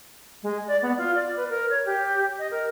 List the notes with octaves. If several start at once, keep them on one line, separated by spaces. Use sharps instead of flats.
G#3
D5
B3
F4
D5
B4
A#4
C#5
G4
D#5
A#4